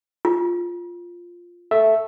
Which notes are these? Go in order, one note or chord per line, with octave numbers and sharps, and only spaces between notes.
F4
A4 E5